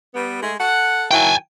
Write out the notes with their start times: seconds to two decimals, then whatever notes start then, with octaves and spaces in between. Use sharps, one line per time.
0.14 G3 B3
0.42 G#3 A3 G#4
0.59 A4 F#5
1.11 D#3 F#3 E4 G5 G#5